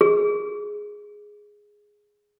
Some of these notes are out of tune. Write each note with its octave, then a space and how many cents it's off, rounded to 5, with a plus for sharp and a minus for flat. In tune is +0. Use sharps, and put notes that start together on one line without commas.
G#4 +0